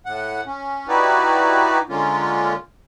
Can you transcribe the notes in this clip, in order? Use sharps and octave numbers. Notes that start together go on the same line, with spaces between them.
A2 F#5
C#4
D#4 E4 F#4 G4 B4 D5
D3 G#3 A#3 C#4 F4